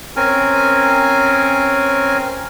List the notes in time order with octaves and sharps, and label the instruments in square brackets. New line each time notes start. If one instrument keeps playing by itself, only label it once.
[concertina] C4 C#4 A#4 G#5